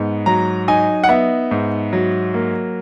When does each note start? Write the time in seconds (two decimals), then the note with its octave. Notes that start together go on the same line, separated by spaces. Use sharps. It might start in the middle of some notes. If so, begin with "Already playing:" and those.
Already playing: G#2 B3
0.26 F#3 A#5
0.68 D#4 G#5
1.04 F#5
1.09 B3 E5
1.51 G#2
1.93 F#3
2.34 A#3